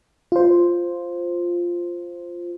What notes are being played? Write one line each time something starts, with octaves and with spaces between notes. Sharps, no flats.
F4 C5